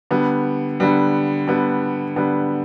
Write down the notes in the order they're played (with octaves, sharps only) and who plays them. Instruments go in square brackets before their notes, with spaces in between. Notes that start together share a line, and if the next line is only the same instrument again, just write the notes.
[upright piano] D3 G3 B3
D3 G3 B3
D3 G3 B3
D3 G3 B3